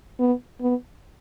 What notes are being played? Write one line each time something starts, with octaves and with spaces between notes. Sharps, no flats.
B3
B3